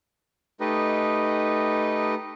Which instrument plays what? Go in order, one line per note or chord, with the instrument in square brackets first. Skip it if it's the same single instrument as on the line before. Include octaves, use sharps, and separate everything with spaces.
[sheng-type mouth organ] A3 D#4 G4 B4 D#5